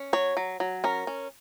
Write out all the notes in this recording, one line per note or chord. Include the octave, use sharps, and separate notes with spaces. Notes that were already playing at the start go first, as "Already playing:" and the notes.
Already playing: C#4
F#3 C#5
F#3
F#3
C#4 A#4
C#4